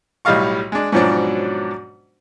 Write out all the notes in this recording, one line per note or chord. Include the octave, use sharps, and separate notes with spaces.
B1 A2 G3 D#5 F5 C#6
G#3 D4
G#2 B2 F3 F#3 C#4 D4